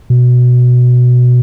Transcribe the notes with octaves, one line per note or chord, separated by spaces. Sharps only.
B2